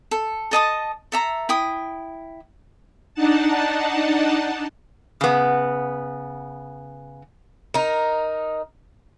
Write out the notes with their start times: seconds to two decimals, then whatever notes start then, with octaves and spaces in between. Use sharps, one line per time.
0.11 A4
0.51 A4 D#5 A5 D#6
1.12 A4 E5 A#5
1.49 E4 G5 D#6
3.15 D4 D#4 F#5 A5
5.21 C#3 B3
7.74 D#4 A#4